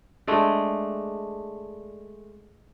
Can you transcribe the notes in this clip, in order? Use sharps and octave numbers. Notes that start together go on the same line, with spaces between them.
G#3 A3 D4